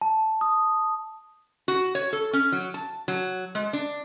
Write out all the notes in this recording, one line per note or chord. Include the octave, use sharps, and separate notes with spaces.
A5
D#6
F#4
C#5
A4
C#4
F#3
A5
F#3
G#3
D4